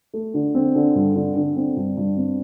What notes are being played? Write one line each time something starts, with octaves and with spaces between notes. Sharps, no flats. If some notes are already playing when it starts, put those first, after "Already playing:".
A3
D3
C4
D3
G2
D3
D3
C4
G2
G2
C4